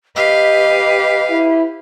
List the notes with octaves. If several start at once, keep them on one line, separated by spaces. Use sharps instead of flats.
G4 B4 D#5 F5
E4